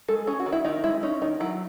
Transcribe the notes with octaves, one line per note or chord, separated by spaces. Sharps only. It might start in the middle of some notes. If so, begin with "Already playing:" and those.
G#3 A4
C#4 G#4
F#4
D#3
E4
D#3 D#4
G#3 E4
C#4 D#4
D#3 D#4
F#3 E4